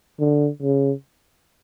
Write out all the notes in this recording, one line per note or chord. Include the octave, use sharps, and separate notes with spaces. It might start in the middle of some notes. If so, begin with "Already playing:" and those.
D3
C#3